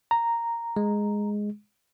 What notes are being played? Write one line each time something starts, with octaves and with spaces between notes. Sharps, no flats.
A#5
G#3